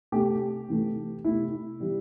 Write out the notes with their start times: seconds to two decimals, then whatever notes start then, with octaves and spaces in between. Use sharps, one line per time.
0.12 C3 A3 G4
0.68 C3 E3 A3
1.24 C3 A3 E4
1.80 C3 E3 G3